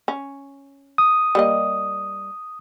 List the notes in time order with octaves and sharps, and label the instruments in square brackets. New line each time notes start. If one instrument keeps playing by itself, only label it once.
[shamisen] C#4
[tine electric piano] D#6
[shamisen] G3 A#3 D#5